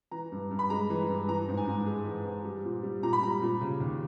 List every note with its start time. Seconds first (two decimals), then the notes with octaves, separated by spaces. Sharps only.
0.11 E3 A#5
0.32 G2
0.51 G2
0.59 B5
0.70 G#3 A#5
0.90 E3
1.09 G2
1.28 E3 A#5
1.48 G#2
1.57 G#5
1.67 G#2
1.86 G#3
2.06 E3
2.25 G#2
2.44 G3
2.65 A#2
2.83 G3
3.03 A#2 A#5
3.13 B5
3.22 G3 A#5
3.42 A#2
3.61 C#3
3.80 D#2